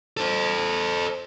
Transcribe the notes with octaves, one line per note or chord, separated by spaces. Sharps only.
A4 C5